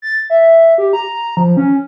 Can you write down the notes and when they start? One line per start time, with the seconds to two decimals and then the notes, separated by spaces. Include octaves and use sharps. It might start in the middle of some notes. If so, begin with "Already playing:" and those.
0.02 A6
0.30 E5
0.78 G4
0.93 A#5
1.37 F3
1.57 C#4